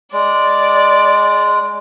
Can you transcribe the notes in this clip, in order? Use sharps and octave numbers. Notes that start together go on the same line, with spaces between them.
G#3 D5